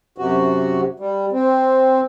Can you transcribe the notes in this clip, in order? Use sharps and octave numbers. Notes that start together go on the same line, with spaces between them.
F#2 C3 F#4
G3
C4